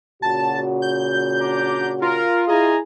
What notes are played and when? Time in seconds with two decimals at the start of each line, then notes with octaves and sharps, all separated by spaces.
0.22 A#2 C#3 F#4 A5
0.82 G6
1.39 D4 A#5 D6
2.02 F4 A#4
2.48 E4 G#4 D#5 G#5 A#5